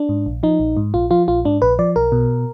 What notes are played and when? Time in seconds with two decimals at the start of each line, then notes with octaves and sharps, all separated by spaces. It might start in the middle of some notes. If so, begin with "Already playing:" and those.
Already playing: D4
0.09 G#2
0.26 A#1
0.43 F3 D#4
0.60 A#1
0.77 G#2
0.94 A#1 F4
1.11 F3 F4
1.28 A#1 F4
1.45 G#2 D4
1.62 A#1 B4
1.79 F3 D5
1.96 B1 A#4
2.12 B2